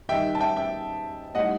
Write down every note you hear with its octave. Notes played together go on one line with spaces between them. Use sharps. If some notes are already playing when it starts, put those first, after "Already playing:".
D#3 G3 D#4 E5 G5
A5
E5 G5
E5 G5
A2 G3 D#4 D#5 F#5